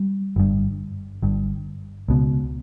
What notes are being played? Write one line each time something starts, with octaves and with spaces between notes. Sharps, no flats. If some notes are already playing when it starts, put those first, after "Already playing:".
Already playing: G3
G1 G2
G1 G2
C#2 B2